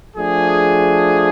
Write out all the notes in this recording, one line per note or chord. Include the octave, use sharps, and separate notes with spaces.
F3 A3 D4 G#4